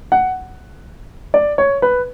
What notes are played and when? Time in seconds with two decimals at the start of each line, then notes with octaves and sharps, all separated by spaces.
0.12 F#5
1.34 D5
1.58 C#5
1.82 B4